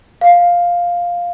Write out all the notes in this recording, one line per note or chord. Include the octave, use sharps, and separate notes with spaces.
F5